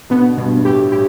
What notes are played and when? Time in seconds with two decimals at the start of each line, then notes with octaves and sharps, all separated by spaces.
0.10 B2 D3 B3
0.37 G2 B2
0.57 G2
0.65 A2 G4
0.92 A2 G4